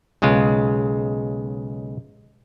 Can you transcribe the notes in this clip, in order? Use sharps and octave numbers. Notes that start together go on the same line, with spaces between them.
B1 C#3 G#3 F4